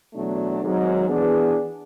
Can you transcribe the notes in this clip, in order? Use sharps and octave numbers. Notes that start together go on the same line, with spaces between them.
E2 B2 F#3 A3 D4
G#1 G#2 F#3
E3 B3 D4 G#4